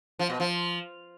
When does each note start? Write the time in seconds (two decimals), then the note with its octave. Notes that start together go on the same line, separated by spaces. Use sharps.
0.19 F3
0.30 B2
0.40 F3